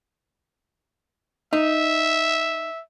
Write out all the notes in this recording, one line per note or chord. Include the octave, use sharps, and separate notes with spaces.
D#4 E5